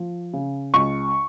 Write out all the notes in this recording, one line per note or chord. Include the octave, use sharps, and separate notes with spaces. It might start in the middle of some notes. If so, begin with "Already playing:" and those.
Already playing: F3
C#3
C#2 C#6